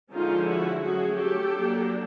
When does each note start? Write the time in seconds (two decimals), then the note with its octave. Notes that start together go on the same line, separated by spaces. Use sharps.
0.12 D3 F3 G#3 C#4 D#4 F4
0.46 E4 F#4
0.81 F#3 A3 C#4 F#4 G#4
1.16 G4 A4
1.51 F#3 A#3 D4